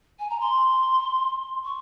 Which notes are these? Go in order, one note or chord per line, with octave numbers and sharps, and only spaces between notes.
G#5
A#5
C6
C#6